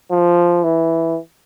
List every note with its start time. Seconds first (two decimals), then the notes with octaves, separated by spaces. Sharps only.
0.11 F3
0.63 E3